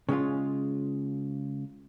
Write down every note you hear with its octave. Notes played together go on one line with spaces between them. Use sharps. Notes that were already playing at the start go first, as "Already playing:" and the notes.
C#3 G#3 C#4 F4